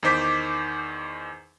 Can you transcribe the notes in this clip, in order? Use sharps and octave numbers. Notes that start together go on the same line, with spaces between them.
E2 D#3 D#4 C5 D6 B6